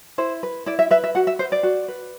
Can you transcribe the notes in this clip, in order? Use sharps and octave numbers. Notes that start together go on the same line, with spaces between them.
E4 C5
B4
E4 D5
E5
B4 E5
E5
F#4 F#5
E5
B4 C5
D5
F#4
B4